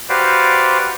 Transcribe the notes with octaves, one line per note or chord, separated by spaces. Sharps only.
F#4 G4 B4 C5 D5 F5